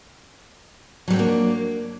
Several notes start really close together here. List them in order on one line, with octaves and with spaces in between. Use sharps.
F#3 G3 C4 D4 A#3